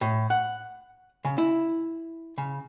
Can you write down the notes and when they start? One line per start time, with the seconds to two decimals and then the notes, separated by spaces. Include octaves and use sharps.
0.01 A2
0.30 F#5
1.25 C#3
1.38 E4
2.38 C#3